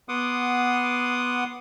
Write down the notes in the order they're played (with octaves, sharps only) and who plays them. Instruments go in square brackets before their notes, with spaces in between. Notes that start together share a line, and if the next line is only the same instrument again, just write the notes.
[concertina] B3 F#5 C6 D6 D#6